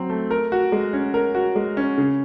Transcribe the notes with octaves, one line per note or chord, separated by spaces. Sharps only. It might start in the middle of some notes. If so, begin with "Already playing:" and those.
Already playing: F#3 C4
A3
A#4
F#4
G#3
C#4
A#4
F#4
G#3
C#4
C#3